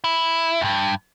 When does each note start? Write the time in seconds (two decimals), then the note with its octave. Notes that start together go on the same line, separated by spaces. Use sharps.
0.04 E4
0.61 D2 G2